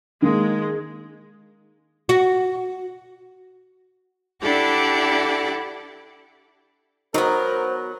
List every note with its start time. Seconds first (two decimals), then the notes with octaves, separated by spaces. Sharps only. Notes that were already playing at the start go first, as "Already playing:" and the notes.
0.22 D#3 G#3 A#3
2.09 F#4
4.42 D4 E4 G4 A4 D5 F#5
7.14 F#3 B3 D#4 A#4 C5